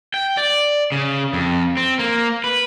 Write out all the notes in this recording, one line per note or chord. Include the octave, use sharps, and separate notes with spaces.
G5
D5
C#3
F2
C4
A#3
B4